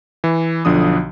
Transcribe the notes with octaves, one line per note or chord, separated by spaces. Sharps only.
E3
B1 D3 F3 D4 D#6